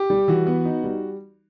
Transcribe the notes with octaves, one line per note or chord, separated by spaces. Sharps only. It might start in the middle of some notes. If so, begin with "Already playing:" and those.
Already playing: G4
G3
E3 F#4
B3
D#4
G3